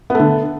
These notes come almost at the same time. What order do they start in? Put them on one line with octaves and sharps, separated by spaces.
B3 A3 D3